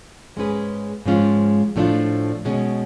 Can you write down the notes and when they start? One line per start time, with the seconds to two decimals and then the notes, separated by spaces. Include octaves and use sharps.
0.36 G#2 G#3 C#4 G#4 B4
1.06 G#2 F3 G#3 C#4 F4
1.76 A2 F3 A3 D4 F4
2.45 B2 G#3 C#4